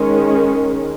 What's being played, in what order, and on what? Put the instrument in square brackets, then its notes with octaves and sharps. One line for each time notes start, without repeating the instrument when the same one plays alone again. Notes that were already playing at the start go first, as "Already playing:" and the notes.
Already playing: [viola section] D#3 G#3 C#4